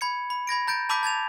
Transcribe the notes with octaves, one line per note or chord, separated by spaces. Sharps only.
B5 G#6 C#7
B5
B5 G#6 A#6 D7
A#5 G6 A6 D7
A5 B5 D6 E6 G6 B6
A5 G#6 A6 F7